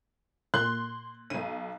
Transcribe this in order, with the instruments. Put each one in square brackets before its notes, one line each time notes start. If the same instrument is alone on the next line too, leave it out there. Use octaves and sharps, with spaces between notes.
[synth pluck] A#2 [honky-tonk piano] C6 [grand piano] F#6
[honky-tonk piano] B1 D#7